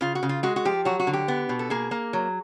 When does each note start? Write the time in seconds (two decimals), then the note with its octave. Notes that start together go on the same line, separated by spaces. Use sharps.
0.01 C#3 F4
0.15 F#4
0.23 C#3
0.29 F4
0.43 G#3 F#4
0.56 F#4
0.65 F3 G4
0.85 F#3 F#4
0.99 F#4
1.07 D3
1.13 G4
1.28 B3
1.49 B2
1.59 A4
1.70 A#3 G#4
1.91 A#3
2.13 F#3